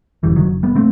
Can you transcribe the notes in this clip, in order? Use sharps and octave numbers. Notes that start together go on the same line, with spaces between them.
F#1 F#2 E3 G3
D#3 F#3
G3 B3
A3 C4